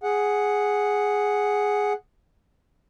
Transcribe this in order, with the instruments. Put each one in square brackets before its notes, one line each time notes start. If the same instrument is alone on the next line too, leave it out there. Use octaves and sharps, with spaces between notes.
[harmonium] G#4 F#5